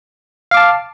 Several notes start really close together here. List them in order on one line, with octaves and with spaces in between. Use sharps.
F5 D6 A5